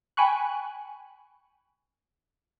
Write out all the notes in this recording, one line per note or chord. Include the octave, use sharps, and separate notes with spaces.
G5 G#5 B5 C#6 F#6